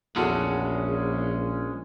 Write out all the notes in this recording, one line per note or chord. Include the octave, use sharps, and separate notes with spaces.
A#1 E2 G#3 C#4 F#4 A4